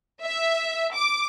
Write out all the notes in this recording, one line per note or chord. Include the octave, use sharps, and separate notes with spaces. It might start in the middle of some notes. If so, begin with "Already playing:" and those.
E5
D6